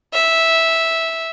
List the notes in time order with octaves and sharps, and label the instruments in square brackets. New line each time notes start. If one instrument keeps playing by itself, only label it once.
[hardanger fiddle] E5